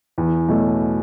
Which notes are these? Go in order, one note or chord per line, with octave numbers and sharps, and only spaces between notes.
E2
B2 F#3 A3